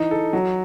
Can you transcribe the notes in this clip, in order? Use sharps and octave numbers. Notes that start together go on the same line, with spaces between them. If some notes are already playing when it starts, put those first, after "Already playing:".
Already playing: E3 D#4
A4
F#3